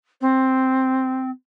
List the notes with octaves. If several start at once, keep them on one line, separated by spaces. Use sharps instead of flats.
C4